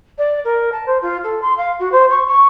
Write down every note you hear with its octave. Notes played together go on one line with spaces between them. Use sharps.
D5
A#4
A5
C5
F4
A4
C6
F5
F#4
C5
C#6
C#6